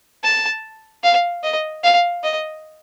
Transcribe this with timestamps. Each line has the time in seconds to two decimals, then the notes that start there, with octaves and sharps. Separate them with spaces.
0.24 A5
1.03 F5
1.43 D#5
1.84 F5
2.24 D#5